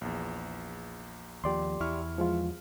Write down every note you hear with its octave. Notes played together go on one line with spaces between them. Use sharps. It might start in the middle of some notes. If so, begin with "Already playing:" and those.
A#1 E2
D#2 F3 G4 D5 C6
E2 E4 C#6 F6
F3 G#3 F4